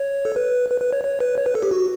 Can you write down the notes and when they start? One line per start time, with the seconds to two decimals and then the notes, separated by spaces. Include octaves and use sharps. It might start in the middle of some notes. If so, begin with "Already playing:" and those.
Already playing: C#5
0.25 A4
0.36 B4
0.70 B4
0.81 B4
0.93 C#5
1.04 C#5
1.20 B4
1.38 C#5
1.46 B4
1.55 A4
1.62 G4
1.71 F#4